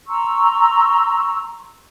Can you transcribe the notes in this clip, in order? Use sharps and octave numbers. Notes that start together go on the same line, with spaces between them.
A#5 C6 C#6 E6